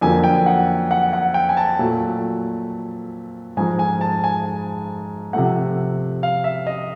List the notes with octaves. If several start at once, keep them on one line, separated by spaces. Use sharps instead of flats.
F2 D3 F#3 A#3 G#5
G5
F#5
F#5
F#5
G5
G#5
A5
A#2 F#3 A3
G#2 F3 G#3 G#5
G#5
A5
G#5
C3 F3 A3 F#5
F5
E5
D#5